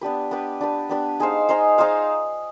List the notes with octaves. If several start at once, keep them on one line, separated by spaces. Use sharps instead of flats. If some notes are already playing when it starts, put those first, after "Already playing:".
B3 D4 G4 B4
B3 D4 G4 B4
B3 D4 G4 B4
B3 D4 G4 B4
D#4 G#4 C5 F5
D#4 G#4 C5 F5
D#4 G#4 C5 F5